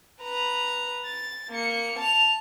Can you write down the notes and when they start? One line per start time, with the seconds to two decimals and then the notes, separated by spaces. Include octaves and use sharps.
0.22 B4 A#5
1.06 A6
1.51 A#3 C#7
1.99 A5 F7